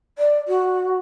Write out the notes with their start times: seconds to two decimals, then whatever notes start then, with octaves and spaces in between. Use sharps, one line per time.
0.18 D5
0.47 F#4